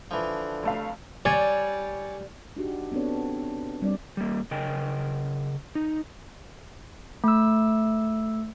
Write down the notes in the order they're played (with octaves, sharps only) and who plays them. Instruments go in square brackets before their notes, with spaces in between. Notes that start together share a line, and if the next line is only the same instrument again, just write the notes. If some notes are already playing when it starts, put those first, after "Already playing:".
[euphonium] D3 [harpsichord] E3 F3
[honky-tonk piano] F1 A3 F5
[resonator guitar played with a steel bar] G3 [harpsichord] C#5 D5 G#5
[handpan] D4 D#4 F#4 G4
B3 C4 D4 A4 C#5
G3 C4 D4 D5
[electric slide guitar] G3 A#3
C#3 A#4 D#5 G5 G#5
D#4
[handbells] A3 E6